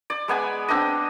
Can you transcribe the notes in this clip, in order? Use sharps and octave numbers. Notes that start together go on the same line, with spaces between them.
D5
G#3 B3 G#5 B5
B3 C4 D4 D#5